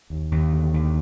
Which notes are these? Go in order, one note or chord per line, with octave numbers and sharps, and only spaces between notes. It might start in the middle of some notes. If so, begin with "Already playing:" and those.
D#2
D#2
D3
D#2